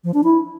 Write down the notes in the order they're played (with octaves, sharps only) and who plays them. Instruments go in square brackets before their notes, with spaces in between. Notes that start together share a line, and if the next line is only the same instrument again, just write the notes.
[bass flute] F3
D4
E4